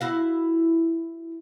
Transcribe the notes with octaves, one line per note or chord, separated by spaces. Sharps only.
E4 F#4 F5